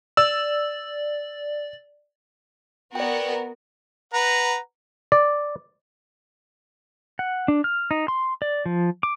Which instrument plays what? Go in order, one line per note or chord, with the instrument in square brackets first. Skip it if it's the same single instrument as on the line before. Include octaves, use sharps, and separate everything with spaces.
[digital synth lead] D5 [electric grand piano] E6
[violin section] B3 F#4 A#4 [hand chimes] D5 G5
[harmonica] B4 F#5 A#5
[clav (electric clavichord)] D5
[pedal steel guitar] F#5
D4
F6
D#4
C6
D5
F3
D6